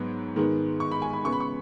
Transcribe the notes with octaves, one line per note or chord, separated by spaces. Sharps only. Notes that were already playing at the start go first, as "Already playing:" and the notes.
Already playing: G#2 F#3 B3
G#2 D#3 G#3 B3
C#6
B5
G#5
B5
C#3 G#3 B3 C#6
B5
C#6